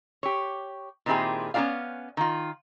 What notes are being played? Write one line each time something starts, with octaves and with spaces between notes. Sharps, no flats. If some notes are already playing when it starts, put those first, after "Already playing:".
G4 C#5
A#2 D#3 C4 E4 G4 G#4
B3 C#4 F#4 G#4 D5 F5
D#3 F4